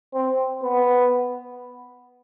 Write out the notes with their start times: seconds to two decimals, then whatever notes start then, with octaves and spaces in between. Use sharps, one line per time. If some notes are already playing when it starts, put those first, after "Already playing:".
0.14 C4
0.63 B3